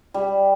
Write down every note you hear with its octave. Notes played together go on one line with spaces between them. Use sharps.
G3